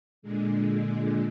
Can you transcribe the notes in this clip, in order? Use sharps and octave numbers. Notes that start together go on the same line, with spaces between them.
A#2 D3 G#3